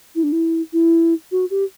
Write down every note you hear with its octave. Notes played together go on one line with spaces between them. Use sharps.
E4
D4
E4
E4
F#4
G4